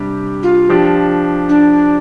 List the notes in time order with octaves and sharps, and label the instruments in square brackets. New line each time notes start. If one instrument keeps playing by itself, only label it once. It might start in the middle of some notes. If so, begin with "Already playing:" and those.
Already playing: [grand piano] C3 G3 D4 G4
[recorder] F4
[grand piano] F3 D4 G4
[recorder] D4